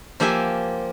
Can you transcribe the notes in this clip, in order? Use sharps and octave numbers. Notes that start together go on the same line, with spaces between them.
F3 A#3 G4 E5 G#5